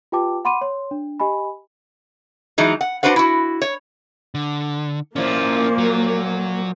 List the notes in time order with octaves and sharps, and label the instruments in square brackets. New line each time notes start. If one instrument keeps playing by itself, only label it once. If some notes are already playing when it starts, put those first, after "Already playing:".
[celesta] F4 G4 B4 G5 A5 D6
F#5 B5 C6 D6 D#7
C#5 C6
D4
G4 D#5 G#5 B5
[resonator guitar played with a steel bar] E3 F#3 G#3 D#4
F#5
D4 F#4 B4 C5 F#5
E4 F#4
C#5
[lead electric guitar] D3
[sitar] A#2 F3 [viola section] A#3 [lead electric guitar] C#4 E4
[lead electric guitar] F#3